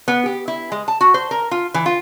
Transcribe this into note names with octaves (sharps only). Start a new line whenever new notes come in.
B3
G4
E4
G#3
A5
F#4
C5
A#4
F4
E3
F4